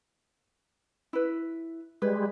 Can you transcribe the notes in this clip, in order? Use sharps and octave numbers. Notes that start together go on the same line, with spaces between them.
E4 B4
G3 G#3 B4